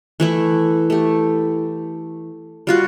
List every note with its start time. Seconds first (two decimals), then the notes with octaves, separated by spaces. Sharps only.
0.20 E3 A3 E4
0.90 A3 G4
2.67 G3 F4 F#4